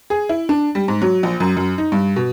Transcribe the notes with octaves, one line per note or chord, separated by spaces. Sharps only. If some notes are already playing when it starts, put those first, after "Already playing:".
G#4
E4
D4
G3
G#2
F#3
A#1
F#2
F#2
D#4
G2
B2